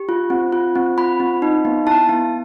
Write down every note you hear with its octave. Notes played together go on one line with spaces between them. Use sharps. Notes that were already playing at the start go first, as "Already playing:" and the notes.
Already playing: G4
F4
C4
F4
C4
F4 B5
C4
D#4
B3
E4 A5
B3